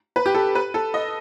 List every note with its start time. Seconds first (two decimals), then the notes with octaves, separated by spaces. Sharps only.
0.16 B4
0.26 G4
0.35 A4
0.55 B4
0.74 A4
0.94 D#5